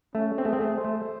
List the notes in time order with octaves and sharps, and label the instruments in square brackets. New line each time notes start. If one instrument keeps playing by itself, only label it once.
[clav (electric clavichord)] A3 [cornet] C#4
[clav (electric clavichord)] C4
[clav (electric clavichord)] A3 [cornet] G#4
[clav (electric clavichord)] C4
A3
[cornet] C5
[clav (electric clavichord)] A3